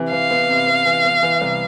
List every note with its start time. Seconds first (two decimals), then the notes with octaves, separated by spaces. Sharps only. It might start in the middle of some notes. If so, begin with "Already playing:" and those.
Already playing: C3 E3
0.12 E3 F5
0.31 B3
0.49 C3
0.67 B3
0.86 E3
1.04 B3
1.23 E3
1.41 C2